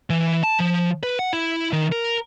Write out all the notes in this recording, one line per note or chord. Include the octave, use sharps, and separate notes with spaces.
E3
A5
F3
B4
F#5
E4
D#3
A#4